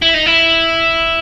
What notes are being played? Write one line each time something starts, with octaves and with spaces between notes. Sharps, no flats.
E4
D#4
E4